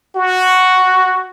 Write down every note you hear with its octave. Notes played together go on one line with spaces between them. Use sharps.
F#4